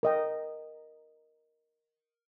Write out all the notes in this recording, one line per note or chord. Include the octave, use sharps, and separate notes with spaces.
A#4 D#5 G5